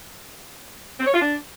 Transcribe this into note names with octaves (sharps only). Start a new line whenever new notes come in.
C4
C#5
F4
D4